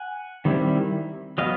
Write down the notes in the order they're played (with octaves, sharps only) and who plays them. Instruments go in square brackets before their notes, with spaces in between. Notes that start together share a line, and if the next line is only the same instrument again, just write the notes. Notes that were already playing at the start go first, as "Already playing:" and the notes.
Already playing: [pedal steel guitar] F#5 G#5
D#3 G3 C4 E4
F#3 B3 D#5 F5